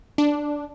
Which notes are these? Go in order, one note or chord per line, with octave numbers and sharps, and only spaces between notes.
D4